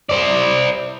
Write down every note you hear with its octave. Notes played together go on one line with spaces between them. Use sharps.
C5 D5